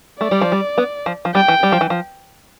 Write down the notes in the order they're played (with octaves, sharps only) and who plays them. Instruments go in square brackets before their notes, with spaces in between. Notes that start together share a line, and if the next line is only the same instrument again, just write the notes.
[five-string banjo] A3 [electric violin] D5
[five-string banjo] G3
F3
G3
B3
F3
F3
[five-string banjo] G3 [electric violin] G5
[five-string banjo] E3
G3
F3
E3
F3